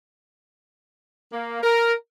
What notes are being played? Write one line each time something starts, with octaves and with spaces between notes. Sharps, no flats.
A#3
A#4